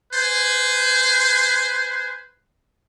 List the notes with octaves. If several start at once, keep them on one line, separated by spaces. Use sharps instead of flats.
B4 C5 G#5